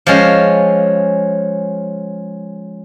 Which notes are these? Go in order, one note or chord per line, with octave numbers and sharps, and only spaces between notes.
F3 G#3 C#4 F5